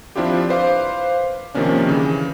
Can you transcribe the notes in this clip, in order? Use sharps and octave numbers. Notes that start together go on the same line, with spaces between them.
F3 C4 D4 E4 F4 G4
B4 C5 F5 D6
C3 D#3 F3 A#3 C#4 D4
C#3 E3